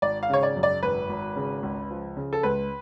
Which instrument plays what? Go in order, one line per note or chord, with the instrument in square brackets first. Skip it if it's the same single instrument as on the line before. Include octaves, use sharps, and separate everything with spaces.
[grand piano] G#1 D5
F5
C#3 C#5
D5
F#2
D5
G#1 B4
G#1
C#3
C#2
F3
C#3
A4
C#2 B4